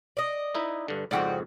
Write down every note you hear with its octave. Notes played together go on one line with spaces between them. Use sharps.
D5 D#5
D#4 E4 B4
G2 D3
F2 G#2 C#3 C4 F#4 D5 F#5 G5